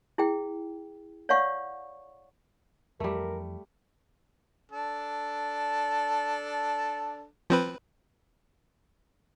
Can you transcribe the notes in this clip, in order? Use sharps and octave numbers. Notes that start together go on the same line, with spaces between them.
E4 G#4 G5
C#5 D5 F5 F#5 C#6
F2 E3 G3 A3 A#4
D4 A4
F3 C4 B4